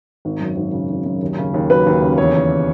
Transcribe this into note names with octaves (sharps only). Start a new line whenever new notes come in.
G#1
F#2
G#1
C#3
G#1
F#2
D#2
C#3
D#2
F#3 B4
D#2
C#3
E2 C#5
D#3